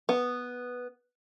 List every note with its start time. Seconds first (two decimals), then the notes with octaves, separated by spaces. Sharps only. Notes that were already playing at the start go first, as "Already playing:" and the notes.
0.09 B3